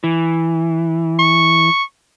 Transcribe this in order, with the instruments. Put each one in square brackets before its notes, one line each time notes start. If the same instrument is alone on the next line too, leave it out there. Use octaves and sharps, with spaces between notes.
[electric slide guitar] E3
[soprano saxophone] C#6